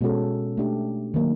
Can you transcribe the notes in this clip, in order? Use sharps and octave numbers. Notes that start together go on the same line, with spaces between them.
B2 G#3 C#4 F#4 A4
A3 D4 G4
D#3 F#3 A#3